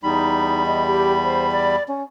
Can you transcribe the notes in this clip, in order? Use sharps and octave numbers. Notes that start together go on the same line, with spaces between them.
E2 G3 D#4 B5
D#5
G4
C5
D5
C#4